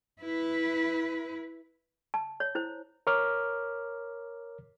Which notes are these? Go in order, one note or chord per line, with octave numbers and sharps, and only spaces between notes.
E4 B4
A5
C#5
E4 C5
A#4 C#5 D6 F6